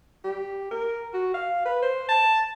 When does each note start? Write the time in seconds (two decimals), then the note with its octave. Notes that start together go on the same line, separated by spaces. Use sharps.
0.24 G4
0.71 A#4
1.14 F#4
1.34 F5
1.65 B4
1.82 C5
2.09 A5